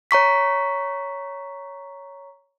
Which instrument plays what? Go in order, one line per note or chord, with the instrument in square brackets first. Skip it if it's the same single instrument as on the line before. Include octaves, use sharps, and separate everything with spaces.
[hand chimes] C#5 A#5 C#6 B6